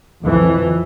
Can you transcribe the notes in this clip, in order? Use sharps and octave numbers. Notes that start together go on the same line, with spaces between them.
F2 E3